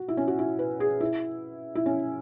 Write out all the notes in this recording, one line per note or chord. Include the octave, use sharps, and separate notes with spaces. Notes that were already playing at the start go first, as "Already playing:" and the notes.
Already playing: F#4
E4
C#4
F#4
E4
B4
G#4
E4
E4
C#4